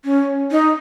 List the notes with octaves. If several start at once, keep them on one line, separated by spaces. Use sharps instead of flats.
C#4
D#4